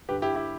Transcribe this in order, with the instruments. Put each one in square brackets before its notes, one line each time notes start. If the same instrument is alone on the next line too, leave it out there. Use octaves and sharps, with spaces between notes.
[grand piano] G2 D3 G4 B4
E4 G4
E4 G4